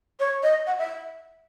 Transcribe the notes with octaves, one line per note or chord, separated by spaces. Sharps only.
C#5
D#5
F#5
E5